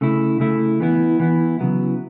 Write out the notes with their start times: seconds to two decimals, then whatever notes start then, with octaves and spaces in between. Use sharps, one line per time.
0.01 C#3 A3 E4
0.40 C#3 A3 E4
0.80 E3 B3 E4
1.20 E3 B3 E4
1.59 C#3 F#3 B3 E4